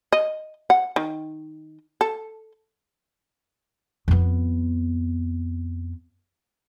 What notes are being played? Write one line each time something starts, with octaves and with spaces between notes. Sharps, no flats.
D#5
F#5
D#3
A4
F2 B3